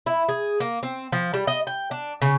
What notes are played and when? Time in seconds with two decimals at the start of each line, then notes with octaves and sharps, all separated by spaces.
0.06 E4
0.29 G#4
0.60 A#3
0.83 C4
1.12 F3
1.34 G3
1.47 D#5
1.67 G5
1.91 D4
2.22 C#3